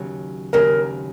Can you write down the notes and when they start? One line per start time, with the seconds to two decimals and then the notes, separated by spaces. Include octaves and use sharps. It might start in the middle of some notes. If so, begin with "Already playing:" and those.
Already playing: D#2 C#3 F#3
0.53 D#2 C#3 F#3 A#4